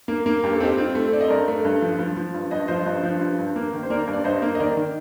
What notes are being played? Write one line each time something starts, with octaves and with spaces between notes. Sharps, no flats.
A#3
A#3
G2 G4
A4
C4 D#4 G4
C4 F4
A3
C4 D5
D#5
G2 A#4 D5
A3
G2
F3
F3
F3
G2
G2 D#5
F3 C5 D#5
G2
F3
G2
G2
A#3
D#3
C5
A#3 A#4 D5
G2
D5
G2 C5 D#5
A#3
D#5
D#3 A#4 D5
D#3